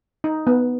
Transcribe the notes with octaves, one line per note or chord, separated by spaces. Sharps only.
D#4
B3